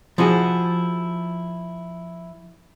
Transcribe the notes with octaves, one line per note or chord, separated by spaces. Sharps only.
F3 E4 F#4 G#4